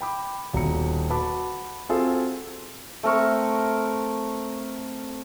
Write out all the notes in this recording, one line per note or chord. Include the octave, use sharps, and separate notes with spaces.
G5 B5 D6
D#1 B2 A#5 C#7
F#4 B4 A5 B5 D6
C4 F4 F#4 G#4 A4
A3 C4 A#4 C#6